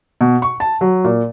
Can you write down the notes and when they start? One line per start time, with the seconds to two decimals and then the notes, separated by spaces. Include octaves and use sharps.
0.21 B2
0.42 C#6
0.60 A5
0.81 F#3
1.04 A#2